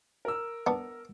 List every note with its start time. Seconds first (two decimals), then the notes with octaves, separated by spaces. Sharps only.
0.25 A#4 E6
0.67 B3 D4